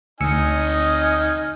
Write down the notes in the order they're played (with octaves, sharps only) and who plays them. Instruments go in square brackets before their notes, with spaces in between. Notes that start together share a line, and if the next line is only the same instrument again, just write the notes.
[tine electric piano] D2 E6 C#7 [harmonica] D#4 G#5 F6 [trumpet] D#5